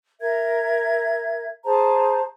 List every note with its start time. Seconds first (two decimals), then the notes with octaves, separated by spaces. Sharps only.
0.20 A#4 E5 G#6
1.64 G#4 C5 A5 A#5